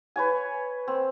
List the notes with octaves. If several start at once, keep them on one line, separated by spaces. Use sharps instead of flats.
B4 C#5 G#5
C4